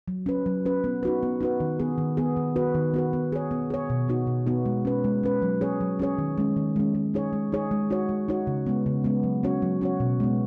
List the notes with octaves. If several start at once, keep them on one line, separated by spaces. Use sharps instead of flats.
F#3
C#4 B4
F#3
C#4 B4
B3
D#4 F#4 B4
B3
D#4 F#4 B4
D#3
B3 G#4
D#3
B3 G#4
D#3
B3 F#4 B4
D#3
B3 F#4 B4
B3
G#4 C#5
B3
G#4 C#5
B2
B3 D#4 F#4
B2
B3 D#4 F#4
G#3
C#4 B4
G#3
C#4 B4
F#3
C#4 G#4 C#5
F#3
C#4 G#4 C#5
D#3
G#3 C#4
D#3
G#3 C#4
G#3
D#4 G#4 C#5
G#3
D#4 G#4 C#5
G#3
D#4 F#4 C#5
G#3
D#4 F#4 C#5
C#3
G#3 B3
C#3
G#3 B3
F#3
C#4 F#4 C#5
F#3
C#4 F#4 C#5
B2
G#3 B3